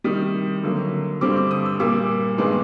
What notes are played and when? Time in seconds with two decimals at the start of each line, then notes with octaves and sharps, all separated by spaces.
0.04 C3 D#3 G3 D#6
0.63 D3 F#3 A#3
1.21 G2 D3 G3 C4 D6
1.36 D6
1.51 D#6
1.65 E6
1.80 A#2 G3 A#3 D6
2.38 G2 D#3 G#3 B3 D4